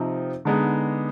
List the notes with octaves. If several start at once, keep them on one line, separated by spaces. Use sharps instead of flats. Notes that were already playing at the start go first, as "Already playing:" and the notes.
Already playing: C3 F3 C4 D#4
D3 G#3 B3 D#4